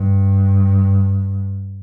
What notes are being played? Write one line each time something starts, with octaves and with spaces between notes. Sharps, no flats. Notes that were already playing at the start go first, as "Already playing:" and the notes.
Already playing: G2